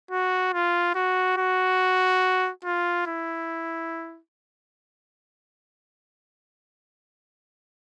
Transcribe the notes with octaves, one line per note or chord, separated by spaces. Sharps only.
F#4
F4
F#4
F#4
F4
E4